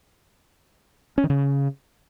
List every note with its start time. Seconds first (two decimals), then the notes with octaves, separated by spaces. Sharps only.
1.18 C#4
1.24 D#3
1.30 C#3